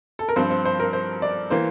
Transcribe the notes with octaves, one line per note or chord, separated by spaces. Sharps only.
A4
A#4
G2 F3 C4 C5
C5
C5
A#4
C5
D5
E3 A#3 C5